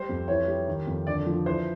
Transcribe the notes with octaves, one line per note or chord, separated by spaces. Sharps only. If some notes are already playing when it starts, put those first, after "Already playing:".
Already playing: G3 C5
F2
E3 C#5
G3
D#3
F2
D3 D5
F3
E3 C5